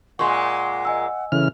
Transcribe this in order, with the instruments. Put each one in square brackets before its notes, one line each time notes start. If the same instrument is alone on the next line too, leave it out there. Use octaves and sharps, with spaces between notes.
[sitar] A#2 G#3 [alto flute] F#5 [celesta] C6 C#6
[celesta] D#5 G#5 E6
[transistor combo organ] C#3 E3 F6 [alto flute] A4